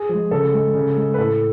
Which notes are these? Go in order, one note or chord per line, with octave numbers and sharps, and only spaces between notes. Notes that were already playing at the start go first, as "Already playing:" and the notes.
Already playing: G#4
F3 G#3
C#3 A4
G#3
C#3
G#3
B4
A2 A4